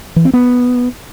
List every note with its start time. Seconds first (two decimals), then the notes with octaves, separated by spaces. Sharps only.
0.16 E3
0.25 C4
0.33 B3